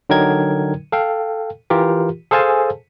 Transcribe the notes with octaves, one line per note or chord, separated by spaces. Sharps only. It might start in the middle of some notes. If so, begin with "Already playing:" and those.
D3 F#3 D#4 A#4 G5 G#6
A4 F5 G5
E3 F4 G4 A#4
G#4 A4 C5 F5 G#5 A5